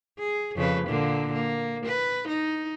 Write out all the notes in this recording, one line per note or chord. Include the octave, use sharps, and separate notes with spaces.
G#4
F2 C#3 B4
A#2 D3 A#3
A#3
B4
D#4